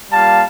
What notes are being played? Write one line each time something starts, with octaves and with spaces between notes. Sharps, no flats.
G3 A#3 F4 F5 A5